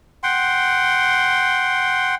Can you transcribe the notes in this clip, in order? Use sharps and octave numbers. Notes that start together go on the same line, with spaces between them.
F#5 G5 C6